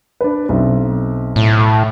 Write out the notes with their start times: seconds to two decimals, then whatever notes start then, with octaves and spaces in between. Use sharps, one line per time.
0.21 D4 B4
0.49 B1 C4 E5
1.36 A2